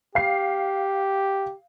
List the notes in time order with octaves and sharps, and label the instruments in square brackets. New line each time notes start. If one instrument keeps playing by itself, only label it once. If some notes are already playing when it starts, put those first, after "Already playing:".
[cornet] G4 [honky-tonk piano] F5 C7